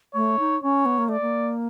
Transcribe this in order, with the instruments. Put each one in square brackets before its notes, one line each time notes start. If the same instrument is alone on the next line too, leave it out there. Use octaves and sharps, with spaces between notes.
[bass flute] A3 [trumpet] C#5
[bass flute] D#4
[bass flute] C#4 [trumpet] C#5
[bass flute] B3
A#3
[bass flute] A3 [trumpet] D5
[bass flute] A#3